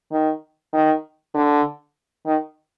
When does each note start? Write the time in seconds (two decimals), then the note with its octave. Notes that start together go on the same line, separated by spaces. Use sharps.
0.12 D#3
0.73 D#3
1.34 D3
2.26 D#3